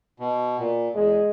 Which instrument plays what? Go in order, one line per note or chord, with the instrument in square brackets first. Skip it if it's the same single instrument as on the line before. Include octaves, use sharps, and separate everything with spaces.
[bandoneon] B2
A#2
[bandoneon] E2 [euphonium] G#3